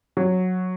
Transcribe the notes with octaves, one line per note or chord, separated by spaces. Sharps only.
F#3